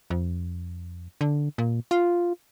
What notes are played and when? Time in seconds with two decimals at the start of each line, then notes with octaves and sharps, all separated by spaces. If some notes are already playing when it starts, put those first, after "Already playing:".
0.10 F2
1.21 D3
1.58 A#2
1.91 F4